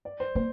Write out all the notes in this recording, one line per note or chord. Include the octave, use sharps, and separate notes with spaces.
D5
C5
A#3 C5